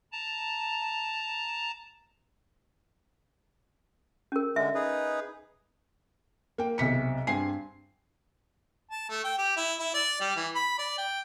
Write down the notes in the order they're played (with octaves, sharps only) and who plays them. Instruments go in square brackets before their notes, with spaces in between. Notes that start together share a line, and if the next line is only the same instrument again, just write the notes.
[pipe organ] A5 A#5
[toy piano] C#4 A#4
[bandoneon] D3 G#3 [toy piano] E5
[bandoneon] D#4 G#4 B4
[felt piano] A#3 G5
B1 C3 B6 C#7
G2 C4 G#5 C7
[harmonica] A5
A3
G5
G4
E4
E4
D5
G3
E3
B5
D5
G5